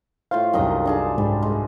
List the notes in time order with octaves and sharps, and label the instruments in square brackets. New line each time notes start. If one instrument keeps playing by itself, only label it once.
[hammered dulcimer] A2 F4 C5 [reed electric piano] F5
[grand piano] C2 F#2 [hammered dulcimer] D#3 D#5 A#5
[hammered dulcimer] D4 G#4 A5
[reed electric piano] G#2 [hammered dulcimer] G3
[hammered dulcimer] G#3